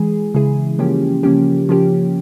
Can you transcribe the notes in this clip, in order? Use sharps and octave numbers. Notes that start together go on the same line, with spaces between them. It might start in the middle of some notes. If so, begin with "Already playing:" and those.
Already playing: E3 G#3 G#4
C#3 E3 G#3 E4 G#4
C#3 F3 A#3 C#4 G4
C#3 F3 A#3 C#4 G4
C#3 F3 A#3 C#4 G4